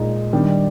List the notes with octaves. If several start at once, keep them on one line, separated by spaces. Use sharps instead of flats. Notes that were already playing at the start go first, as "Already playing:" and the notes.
Already playing: A#2 G#3 D#4
D#3 G3 D4